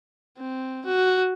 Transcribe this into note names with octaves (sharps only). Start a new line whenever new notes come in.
C4
F#4